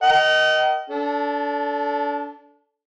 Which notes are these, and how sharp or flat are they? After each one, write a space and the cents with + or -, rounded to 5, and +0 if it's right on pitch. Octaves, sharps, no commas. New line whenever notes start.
A#4 +0 D#5 +0 G5 -45
D4 -30 A4 +0